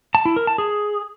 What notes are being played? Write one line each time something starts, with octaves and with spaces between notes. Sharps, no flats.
A5
E4
A#4
A5
G#4